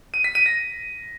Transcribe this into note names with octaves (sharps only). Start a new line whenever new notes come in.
D#7
B6
D#7
A#6